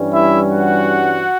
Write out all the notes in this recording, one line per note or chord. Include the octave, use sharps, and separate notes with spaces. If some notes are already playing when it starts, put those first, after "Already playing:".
Already playing: G2 E3 G3 C#4
E4 E5
F#4 F#5